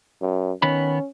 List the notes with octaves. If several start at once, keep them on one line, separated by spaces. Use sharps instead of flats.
F#2
D#3 B3 C#4 B5